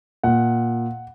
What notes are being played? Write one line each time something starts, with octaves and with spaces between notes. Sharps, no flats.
A#2 F#5